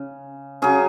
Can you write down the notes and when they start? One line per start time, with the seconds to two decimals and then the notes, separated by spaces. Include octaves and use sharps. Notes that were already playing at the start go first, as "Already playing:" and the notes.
Already playing: C#3
0.62 C#3 F#3 C#4 G#4